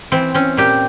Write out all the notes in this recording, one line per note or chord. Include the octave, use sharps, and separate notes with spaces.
E3 C4
C4 C#4
A#2 G4